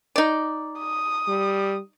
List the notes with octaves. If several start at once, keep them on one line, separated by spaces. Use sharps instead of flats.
D#4 D5
D#6
G3